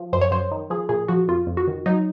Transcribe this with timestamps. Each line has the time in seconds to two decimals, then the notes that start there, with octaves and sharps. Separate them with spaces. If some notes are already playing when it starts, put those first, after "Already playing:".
Already playing: F3
0.13 F#2 C5
0.21 C#5
0.31 F#2 C5
0.51 D#3
0.70 F3 G#4
0.89 A#2 G#4
1.08 F3 F#4
1.28 F2 F4
1.47 F2
1.57 F#4
1.67 D#3
1.86 F#3 D#4